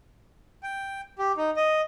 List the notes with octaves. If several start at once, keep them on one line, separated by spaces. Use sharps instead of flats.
G5
G4
D#4
D#5